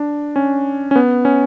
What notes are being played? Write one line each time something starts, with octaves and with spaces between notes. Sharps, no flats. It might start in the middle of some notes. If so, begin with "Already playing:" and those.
Already playing: D4
C#4
C#4
B3
C#4